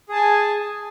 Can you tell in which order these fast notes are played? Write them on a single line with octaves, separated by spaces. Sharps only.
G#4 A5 G#5